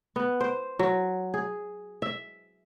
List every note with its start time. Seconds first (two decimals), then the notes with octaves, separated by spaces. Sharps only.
0.16 B3
0.40 C5
0.79 F#3
1.34 G#4
2.02 E5